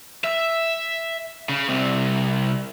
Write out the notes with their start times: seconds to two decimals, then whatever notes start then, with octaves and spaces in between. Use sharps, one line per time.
0.24 E5
1.49 C#3
1.69 C2 C3